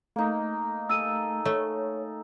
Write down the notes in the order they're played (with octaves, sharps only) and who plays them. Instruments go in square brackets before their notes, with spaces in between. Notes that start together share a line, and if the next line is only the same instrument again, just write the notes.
[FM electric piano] A3 [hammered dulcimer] A#3 D#4
[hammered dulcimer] G#4 A4 [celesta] E6 D#7
[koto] A3 [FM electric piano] C#5